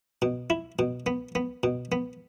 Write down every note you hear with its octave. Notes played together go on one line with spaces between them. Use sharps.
B2
E4
B2
B3
B3
B2
B3